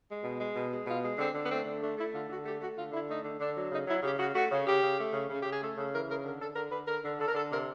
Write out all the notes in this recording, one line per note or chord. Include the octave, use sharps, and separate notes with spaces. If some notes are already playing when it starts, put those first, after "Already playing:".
G#3
B2
G#3
B2
G#3
B2 F4
G#3
D3 C4
D3
B3
A3 C4
D3
A3 D4
A3 E4
D3 F4
D3 F#4
A3 G4
A3 F#4
D3 F4
D3 E4
A3 D#4
D3
D3 D4
F#3
C#3 D#4
F#3 E4
C#3 G4
C#3 F#4
A3 F#4
C#3
C#3 G4
C#3
A3
C#3
C#3
C#3 G4
G#4
A3 A4
C#3 A4
E3 A#4
C#3 A#4
D3 A#4
D3 A4
D3 A#4
D3 B4
D3 A#4
D3
D3 A4
A#4
D3 A4
C3 A#4